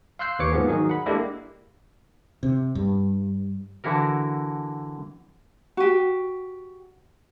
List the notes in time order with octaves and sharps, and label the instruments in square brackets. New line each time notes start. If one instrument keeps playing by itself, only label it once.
[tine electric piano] F5 C6 E6 F#6 G6 C7
D#2 B4 C#5 D6 C#7
G#2 F3 A#3 B3 G#4
D#3 F#3 D#4 G#4
F#5 B5
G#3 A#3 D4 E4 G4 A4
[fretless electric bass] C3
G2
[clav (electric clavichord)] D3 E3 E4 F#4 A#4
[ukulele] F#4 G4